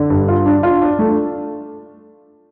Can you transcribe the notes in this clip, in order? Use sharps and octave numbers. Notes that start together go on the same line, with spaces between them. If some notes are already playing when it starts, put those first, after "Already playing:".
Already playing: D3
G2
F4
D4
F4
D4
A3